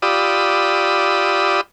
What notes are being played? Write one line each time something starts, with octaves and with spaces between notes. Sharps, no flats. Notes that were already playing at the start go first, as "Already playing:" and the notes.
F4 G4 D5 B5 D#6 E6